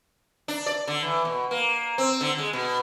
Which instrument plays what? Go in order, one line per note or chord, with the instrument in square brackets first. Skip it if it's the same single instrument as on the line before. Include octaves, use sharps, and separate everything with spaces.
[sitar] D4
D5
D3
E3
B2
A#3
C4
D3
G#3
B2